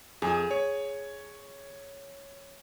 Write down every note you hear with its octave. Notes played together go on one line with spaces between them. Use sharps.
F2 G#4
C#5